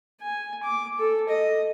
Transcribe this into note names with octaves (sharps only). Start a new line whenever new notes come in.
G#5
D6
A4
D#5